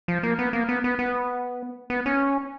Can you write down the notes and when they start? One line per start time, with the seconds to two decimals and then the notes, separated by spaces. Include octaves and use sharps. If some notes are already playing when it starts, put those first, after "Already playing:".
0.08 F3
0.23 A#3
0.39 B3
0.53 A#3
0.69 B3
0.84 B3
0.99 B3
1.90 B3
2.06 C#4